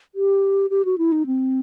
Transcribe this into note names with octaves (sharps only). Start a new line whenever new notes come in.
G4
G4
F#4
E4
D#4
C4